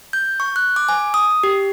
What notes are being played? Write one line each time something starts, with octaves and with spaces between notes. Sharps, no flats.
G6
C#6
F#6
D6
G#5
D#6
G4